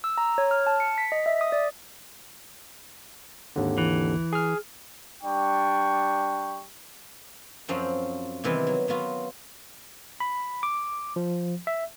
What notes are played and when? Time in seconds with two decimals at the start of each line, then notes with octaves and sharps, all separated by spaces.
0.04 E6
0.18 A#5
0.38 C#5
0.51 F6
0.67 A5
0.80 C#7
0.98 B6
1.12 D#5
1.26 E5
1.41 D#6
1.52 D5
3.56 G#1 D#2 D3
3.78 E3
4.33 G#4 F6
5.22 G3 D4 G5 C#6
7.68 F#2 F3 C4 C#4 F#5
8.44 C3 D#3 E3 G3 B3
8.67 F#3
8.88 F#3 B3 F4 F#4
10.20 B5
10.63 D6
11.16 F3
11.67 E5